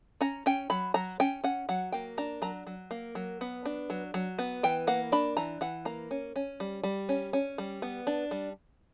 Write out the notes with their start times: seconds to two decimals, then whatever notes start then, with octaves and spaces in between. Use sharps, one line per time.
0.21 C#4 A#5
0.46 C#4 G5
0.70 F#3 B5
0.94 F#3 A#5
1.20 C#4 G5
1.44 C#4 F#5
1.69 F#3 F#5
1.92 A#3 G5
2.18 D4 A#5
2.42 F#3 A#5
2.67 F#3
2.91 A#3
3.15 F#3
3.41 B3
3.65 D4
3.90 F#3
4.14 F#3
4.39 B3
4.63 E3 G5
4.87 A#3 F#5
5.12 D4 B5
5.37 E3 A#5
5.61 E3 F#5
5.85 A#3 A#5
6.11 C#4
6.36 C#4
6.60 G3
6.83 G3
7.09 C#4
7.33 C#4
7.58 G3
7.82 B3
8.07 D4
8.31 G3